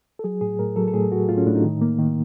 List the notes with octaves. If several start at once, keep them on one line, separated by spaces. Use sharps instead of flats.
A4
F#3 G#4
A2 G#4
A2 A#4
F#3 A4
A4
A2 G#4
A2 F#4
A2 F4
C#4
A2 D4
D#4
D#3
A#3
D#3